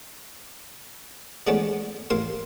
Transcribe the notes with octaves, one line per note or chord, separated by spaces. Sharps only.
E3 G#3 A3 B3 C#4 D4
A1 A#4 F5 C6